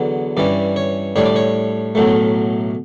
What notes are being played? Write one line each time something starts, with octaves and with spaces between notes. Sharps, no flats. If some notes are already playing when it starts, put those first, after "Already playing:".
Already playing: E2 D3 F#3 B3
G2 E3 G3 C#4 D5
C#5
A2 G3 D4 C#5
D5
C#5
B1 A2 F#3 A3